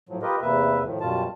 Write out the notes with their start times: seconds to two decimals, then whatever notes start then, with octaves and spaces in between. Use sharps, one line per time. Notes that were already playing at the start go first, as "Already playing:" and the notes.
0.09 A2 F3 F#3
0.22 F4 G4 A#4 B4 D#5
0.41 E2 C3 A#3 B4 E5
0.84 A2 D#3 F3
1.01 F#2 B2 G3 F4 A5